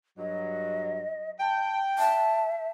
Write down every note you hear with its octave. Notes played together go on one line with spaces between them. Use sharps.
G2 F#3 D#5
G5 A5
E5 A5